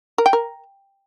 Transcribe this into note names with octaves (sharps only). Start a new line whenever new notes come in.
A#4
G5
A#4